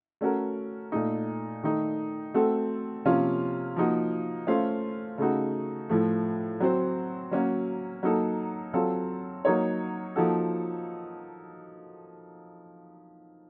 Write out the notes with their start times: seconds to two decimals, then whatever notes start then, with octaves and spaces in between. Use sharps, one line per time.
0.21 A3 C#4 F#4 A#4
0.92 A#2 A3 D#4
1.63 D#3 A3 D#4
2.34 A3 C4 F#4 A4
3.05 C3 F3 A#3 C#4 F4
3.76 F3 A#3 D#4 F#4
4.47 A3 C#4 F4 C5 F5
5.18 C#3 A3 D#4 F#4
5.89 A2 F3 A3
6.60 F#3 C4 F#4 C5
7.31 F#3 A#3 C#4 F#4
8.03 F#3 A#3 D#4 A4
8.74 F#3 C4 F4 A4
9.45 F#3 A#3 D#4 A#4 C#5
10.16 F3 A#3 D#4 F#4 A4